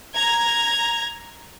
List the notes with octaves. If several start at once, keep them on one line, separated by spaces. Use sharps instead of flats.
A#5 G#6